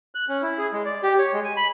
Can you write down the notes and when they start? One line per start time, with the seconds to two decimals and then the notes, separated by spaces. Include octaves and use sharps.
0.15 F#6
0.29 C#4
0.42 E4
0.58 G#4
0.73 G#3
0.85 D5
1.03 G4
1.18 C#5
1.33 G#3
1.44 G#5
1.57 B5